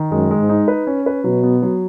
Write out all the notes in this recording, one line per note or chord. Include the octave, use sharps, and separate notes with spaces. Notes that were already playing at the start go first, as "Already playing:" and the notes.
Already playing: D#3
F#2 G#3
G#3
G#2
D#4
B4
C#4
B4
B2 F#3
B3
F#3